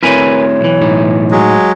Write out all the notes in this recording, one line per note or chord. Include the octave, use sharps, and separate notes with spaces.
A3 C4 E4 A#4 B4 C#5 G#5
B1 E3
A2 D#4
F#3 G#3